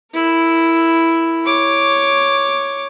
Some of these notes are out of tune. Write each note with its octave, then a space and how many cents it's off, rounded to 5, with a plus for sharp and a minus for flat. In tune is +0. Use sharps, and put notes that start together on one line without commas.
E4 +0 A#4 -30
C#5 +0 D6 +0